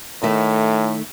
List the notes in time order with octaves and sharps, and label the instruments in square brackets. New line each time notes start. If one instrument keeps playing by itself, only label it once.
[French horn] A2 [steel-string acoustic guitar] D#3 A3